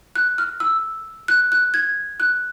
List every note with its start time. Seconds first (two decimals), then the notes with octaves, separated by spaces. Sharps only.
0.15 F#6
0.38 F6
0.60 E6
1.28 F#6
1.52 F#6
1.74 G#6
2.20 F#6